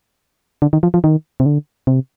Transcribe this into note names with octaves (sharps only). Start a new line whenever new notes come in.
D3
D#3
F3
F3
D#3
C3
D3
C3